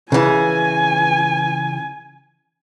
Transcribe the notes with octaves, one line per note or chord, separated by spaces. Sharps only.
C#3 E3 G#5